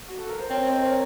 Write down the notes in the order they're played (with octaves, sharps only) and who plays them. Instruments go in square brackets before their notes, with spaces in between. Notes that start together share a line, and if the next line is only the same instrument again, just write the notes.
[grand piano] F#4
A4
A#4
C5
[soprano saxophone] C4 [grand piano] A#4 C#5
[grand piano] C5 D#5
A#4 C#5